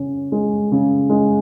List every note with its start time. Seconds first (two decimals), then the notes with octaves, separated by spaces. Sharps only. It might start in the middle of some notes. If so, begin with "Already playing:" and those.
Already playing: C#3 C#4
0.32 G#3
0.72 C#3
1.10 G#3